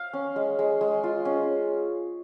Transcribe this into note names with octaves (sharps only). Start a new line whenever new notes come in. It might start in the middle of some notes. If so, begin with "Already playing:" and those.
Already playing: F5
C#4
G#3
G#3
G#3
F4
C#4